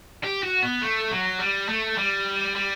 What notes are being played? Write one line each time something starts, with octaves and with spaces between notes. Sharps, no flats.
G4
F#4
B3
A3
F#3
G3
A3
G3
G3